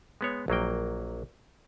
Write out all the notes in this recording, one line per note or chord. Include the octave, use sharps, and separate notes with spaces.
G#3 B3 C#5
A#1 F#3 A#3 G5